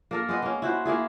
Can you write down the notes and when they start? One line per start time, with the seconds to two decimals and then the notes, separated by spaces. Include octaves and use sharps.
0.11 A#3 A4 A#4
0.29 G#3 B3 D#5
0.42 A#3 C#4
0.62 E4 F#4 C5
0.85 A3 A#3 E4 G#4